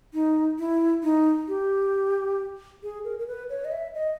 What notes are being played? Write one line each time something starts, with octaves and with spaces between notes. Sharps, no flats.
D#4
E4
D#4
G4
G#4
A#4
A#4
B4
C#5
D#5
E5
D#5